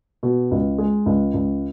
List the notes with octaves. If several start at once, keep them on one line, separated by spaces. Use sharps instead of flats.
B2
C#2
G#3
C#2
C#2